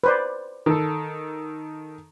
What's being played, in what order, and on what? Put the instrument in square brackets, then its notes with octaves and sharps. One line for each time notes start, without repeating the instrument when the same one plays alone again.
[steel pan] B4 C5 D5
[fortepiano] D#3 A4